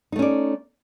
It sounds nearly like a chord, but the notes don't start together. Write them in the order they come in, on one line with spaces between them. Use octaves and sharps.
D#4 A3 C#4 D5